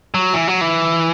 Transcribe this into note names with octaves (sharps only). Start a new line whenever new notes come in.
F#3
E3
F#3
E3